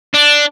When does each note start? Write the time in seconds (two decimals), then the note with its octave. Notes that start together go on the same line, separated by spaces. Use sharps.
0.14 D4